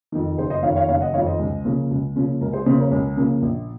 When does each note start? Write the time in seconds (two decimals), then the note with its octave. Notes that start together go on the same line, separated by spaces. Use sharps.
0.12 F2 D#3
0.37 F#1 G#4 C5
0.50 C5 D#5
0.63 F2 D#3 C#5 F5
0.76 C#5 F5
0.88 F#1 C#5 F5
1.01 D#5 F#5
1.13 D#3 C#5 F5
1.17 F2
1.26 C5 D#5
1.39 C#2
1.64 C#3 F3 A#3 C#4
1.91 C#2
2.15 C#3 F3 A#3 C#4
2.41 C#2 A#4
2.53 G#4 C5
2.66 C#3 F3 A#3 C#4 G#4 C5
2.80 A#4 C#5
2.91 C#2
3.17 C#3 F3 A#3 C#4
3.42 A#1